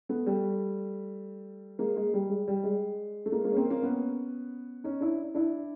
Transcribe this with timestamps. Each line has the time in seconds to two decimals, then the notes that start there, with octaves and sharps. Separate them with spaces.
0.09 A3 B3
0.26 G3 A3
1.79 G#3 A#3
1.96 G#3
2.14 G3
2.30 G#3
2.48 G3
2.63 G#3
3.26 A3
3.32 G#3 A#3
3.44 G#3 A#3
3.52 C#4
3.57 A#3 C4
3.70 A#3 C4
3.82 B3 C#4
4.84 C#4 D#4
5.01 D4 E4
5.34 D4 E4